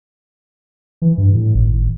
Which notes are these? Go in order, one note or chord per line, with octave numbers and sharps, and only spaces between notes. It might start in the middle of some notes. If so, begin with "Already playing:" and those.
E3
G2
A2
G#1